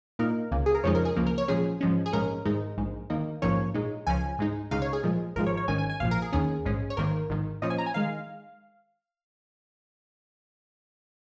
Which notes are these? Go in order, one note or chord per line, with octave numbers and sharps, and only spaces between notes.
A#2 A#3 D#4 A#4
C#2 C#3 A#3
G#4
A#4
F2 C#3 F3 G#3 D#4 C#5
A#4
G#4
C#2 C#3 F3 A#3
A#4
C#5
A#2 F3 G#3 C#4 G#4
G#2 F3 G#3 C#4
G#4
A#1 G#2 G#3 C#4 A#4
G#1 G#2 G#3 D#4
A#1 G#2 G#3
D#2 D#3 A#3 D#4
A#1 G#2 F3 A#3 C#4 C#5
A#2 G#3 D#4
C#2 C#3 F3 C#4 G#5
G#2 G#3 D#4
C#2 C#3 G#3 D#4 F5
C#5
G#4
A#2 F3 G#3
G#1 G#2 F3 G#3 A#4
C#5
C#5
G#1 G#2 D#3 C#4 G#5
G#5
G#5
A#1 A#2 F3 F5
A#4
G#4
D#2 D#3 C#4 G#4
A#1 G#2 G#3 C#4
C#5
G#1 G#2 D#3 A#3 A#4
G#1 G#2 D#3
A#2 F3 C#4 D#5
G#5
A#5
G#5
D#3 G#3 F5